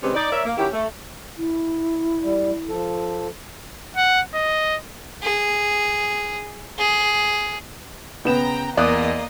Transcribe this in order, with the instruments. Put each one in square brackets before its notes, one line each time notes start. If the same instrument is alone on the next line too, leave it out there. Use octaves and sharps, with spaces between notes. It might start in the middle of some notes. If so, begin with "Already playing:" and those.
[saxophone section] C3 D#3 G#3 C4 C#4 B4
D#4 D5
A#4 C#5 D5 E5
A#3
D#3 C#4 E4 F#4 G4
A3
[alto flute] E4
[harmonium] G3
F3 A4
[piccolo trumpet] F#5
D#5
[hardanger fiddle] G#4
G#4
[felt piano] C#3 [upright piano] B3 E7 [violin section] G5 A#5
[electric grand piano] E2 [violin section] A#3 D#5 [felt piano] D5 D#6 F#6